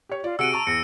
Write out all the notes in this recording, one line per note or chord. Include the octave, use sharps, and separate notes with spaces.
G4 C#5
F4 D5
C3 F#4 G#4 F#5 E6 D7 D#7
A5 A#5 C#6
E2 A#6 C#7